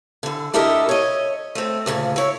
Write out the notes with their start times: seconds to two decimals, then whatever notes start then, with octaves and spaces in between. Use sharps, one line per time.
0.23 D3 E3
0.54 D4 E4 G4 A4 A#4 D#5
0.89 C#5 D#5
1.55 A3 C4
1.86 D2 A#2 C#3
2.16 E4 C#5